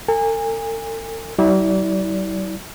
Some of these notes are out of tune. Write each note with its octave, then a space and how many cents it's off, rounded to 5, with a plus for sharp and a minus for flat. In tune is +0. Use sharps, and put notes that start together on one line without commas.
A4 +45 G#5 -30
G3 -45 E4 -35 D5 -30